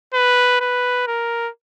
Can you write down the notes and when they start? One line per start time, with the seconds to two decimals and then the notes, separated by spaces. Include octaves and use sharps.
0.14 B4
0.61 B4
1.07 A#4